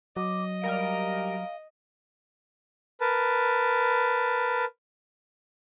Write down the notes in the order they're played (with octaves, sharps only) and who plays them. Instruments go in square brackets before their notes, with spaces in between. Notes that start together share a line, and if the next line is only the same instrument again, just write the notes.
[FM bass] F#3 [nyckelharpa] D#5 [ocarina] D6
[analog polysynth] G3 A#4 D7 [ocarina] F5
[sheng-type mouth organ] A#4 B4 A5